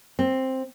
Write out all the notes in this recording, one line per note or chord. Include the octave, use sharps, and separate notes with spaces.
C4